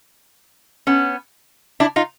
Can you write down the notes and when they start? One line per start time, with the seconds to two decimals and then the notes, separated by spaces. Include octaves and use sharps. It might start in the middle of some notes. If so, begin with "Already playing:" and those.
0.87 B3 C#4
1.80 D4 E4
1.96 D#4 F4